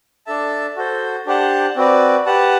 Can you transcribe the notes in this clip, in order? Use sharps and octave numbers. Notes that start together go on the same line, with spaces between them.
D4 A4 E5 A5
F#4 A4 C5
D4 G4 C5 F#5 A5
C4 F#4 B4 D5
G4 B4 F#5 A5